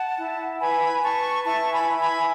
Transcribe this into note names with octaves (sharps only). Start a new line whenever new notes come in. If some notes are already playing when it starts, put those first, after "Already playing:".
Already playing: F#5 A5
E4
B4 G#5 B5
B4 A5 C#6
E4 A5 C#6
G#5 B5
E4
G#5 B5